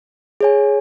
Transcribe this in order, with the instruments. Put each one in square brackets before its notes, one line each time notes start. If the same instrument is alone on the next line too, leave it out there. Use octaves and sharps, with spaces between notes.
[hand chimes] G#4 C#5 G#5